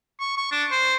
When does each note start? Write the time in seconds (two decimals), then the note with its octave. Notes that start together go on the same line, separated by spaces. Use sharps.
0.20 C#6
0.37 C#6
0.52 D4
0.71 C5